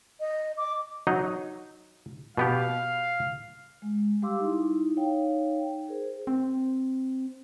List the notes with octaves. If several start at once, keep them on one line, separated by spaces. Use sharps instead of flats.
D#5
D6
F#3 D#4 D#5
B2 B3 G4 F5
G#3
G3 G4 F5 C6 D6 E6
D#4 E4
D#4 C#5 F5 G5
G#4 A#4 C5
C4